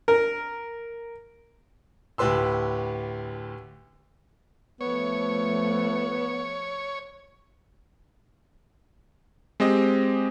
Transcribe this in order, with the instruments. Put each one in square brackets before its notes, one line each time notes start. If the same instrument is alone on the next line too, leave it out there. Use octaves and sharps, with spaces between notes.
[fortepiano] A#4
[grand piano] D2 A2 G4 B4 C6 E6
[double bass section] F3 A3 [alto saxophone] B3 [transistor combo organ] C#5
[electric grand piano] G#3 C4 G4 D#5